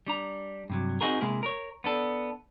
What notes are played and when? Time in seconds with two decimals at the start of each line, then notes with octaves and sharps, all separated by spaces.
0.07 G3 D4 A#5
0.70 G2 C3 F#3
1.01 C4 D#4 F#4 G#4 A#4
1.21 C3 G#3 A#3 E4 G#4
1.43 A#4 C#5
1.84 B3 D4 A4